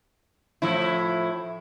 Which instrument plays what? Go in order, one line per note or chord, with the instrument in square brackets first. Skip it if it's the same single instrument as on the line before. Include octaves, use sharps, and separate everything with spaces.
[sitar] A2 F3 E4